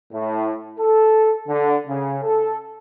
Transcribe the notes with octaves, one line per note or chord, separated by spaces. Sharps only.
A2
A4
D3
C#3
A4